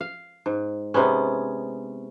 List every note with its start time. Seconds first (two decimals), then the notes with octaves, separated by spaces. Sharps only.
0.01 F5
0.46 G#2
0.94 C3 G#3 B3 C#4